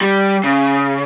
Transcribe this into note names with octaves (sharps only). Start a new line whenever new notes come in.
G3
C#3